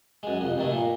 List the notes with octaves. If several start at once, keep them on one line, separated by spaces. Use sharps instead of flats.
F#2 G#3
C2 F2
G2 D#3 A3
A#2